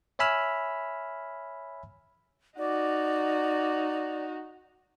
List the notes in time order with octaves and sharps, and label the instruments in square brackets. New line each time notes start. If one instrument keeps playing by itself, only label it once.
[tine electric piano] C#5 E5 G#5 B5 E6 F6
[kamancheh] D#4 F#4 [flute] D5